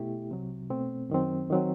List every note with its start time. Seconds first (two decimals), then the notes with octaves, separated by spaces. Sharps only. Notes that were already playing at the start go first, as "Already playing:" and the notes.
Already playing: B2 A3 E4 G4
0.30 C2 C3 F#3
0.70 B2 A3 C4
1.10 F#2 D#3 F#3 C4
1.50 D#3 F#3 C4